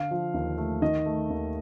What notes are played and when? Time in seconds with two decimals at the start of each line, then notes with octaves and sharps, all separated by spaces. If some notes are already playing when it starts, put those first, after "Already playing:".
Already playing: D3 F5
0.11 F3
0.34 D#2
0.58 A3
0.82 D#3 D#5
1.06 A3
1.30 D#2